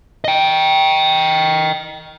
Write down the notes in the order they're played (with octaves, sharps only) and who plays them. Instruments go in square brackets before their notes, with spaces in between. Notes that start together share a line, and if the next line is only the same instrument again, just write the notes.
[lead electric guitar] D#5 G5